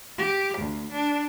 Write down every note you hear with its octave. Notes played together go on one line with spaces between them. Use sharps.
G4
D2
D4